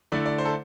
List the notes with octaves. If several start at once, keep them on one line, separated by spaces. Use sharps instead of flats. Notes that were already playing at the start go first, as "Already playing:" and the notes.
D3 A3 E4 D5
D5
C5
A4